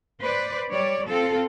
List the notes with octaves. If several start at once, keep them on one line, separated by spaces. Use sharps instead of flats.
B4 C5 D5
G3 C#5 D5
C4 F4 A4